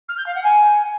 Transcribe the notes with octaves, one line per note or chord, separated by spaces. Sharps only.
F6
G6
F5
F#5
G#5